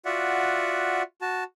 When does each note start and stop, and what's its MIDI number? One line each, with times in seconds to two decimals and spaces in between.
0.05 1.02 65
0.05 1.02 66
0.05 1.02 74
0.05 1.02 76
0.05 1.02 78
1.22 1.44 66
1.22 1.44 81